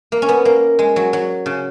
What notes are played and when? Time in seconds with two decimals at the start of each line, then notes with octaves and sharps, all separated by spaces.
0.12 A#3
0.22 C#4
0.29 B3
0.45 A#3
0.79 G#3
0.96 F#3
1.13 F#3
1.46 C#3